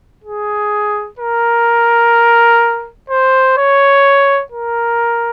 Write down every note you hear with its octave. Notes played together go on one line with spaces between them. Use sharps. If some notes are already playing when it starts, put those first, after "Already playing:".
G#4
A#4
C5
C#5
A#4